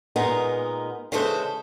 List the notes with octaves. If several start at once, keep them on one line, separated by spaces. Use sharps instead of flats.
A#2 G#3 B3 D#4 A#4 A#5
C#3 E3 G#3 A4 B4 C5